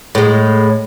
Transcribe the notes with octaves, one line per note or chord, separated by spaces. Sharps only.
A2 G#3